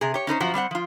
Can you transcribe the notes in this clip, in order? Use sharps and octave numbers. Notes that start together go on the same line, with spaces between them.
C3 G#4
G4 C#5
C#4 D#4 B4 C5
F#2 F3 F#4
G3 C4 C5 F#5
F3 F4